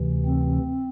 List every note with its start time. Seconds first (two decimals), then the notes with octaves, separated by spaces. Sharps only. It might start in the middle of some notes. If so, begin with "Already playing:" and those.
Already playing: D2 C3 E3
0.26 C4